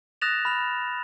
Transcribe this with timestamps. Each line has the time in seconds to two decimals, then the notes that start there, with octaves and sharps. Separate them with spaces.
0.22 D#6 F#6 A6 A#6 E7 F7
0.45 B5 F6 F7